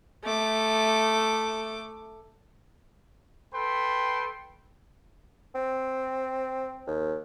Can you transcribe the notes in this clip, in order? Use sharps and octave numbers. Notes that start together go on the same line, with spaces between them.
A3 D6
A4 B4 G5 B5 C6
C4
D#2